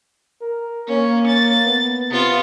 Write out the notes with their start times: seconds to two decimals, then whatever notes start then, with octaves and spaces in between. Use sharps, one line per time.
0.41 A#4
0.88 A#3 C#4
1.28 A6
1.66 B3
2.11 C3 B3 F4